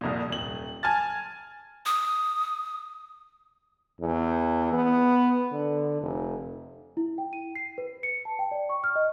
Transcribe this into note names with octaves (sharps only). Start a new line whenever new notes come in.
C2 F2 A#2
D#1 F#7
G#5 A5 F6 A6
D#6
E2
B3
D3
F1
E4
G5
D#7
C7
B4
C#7
A5
G5
D5
C#6
F6
D#5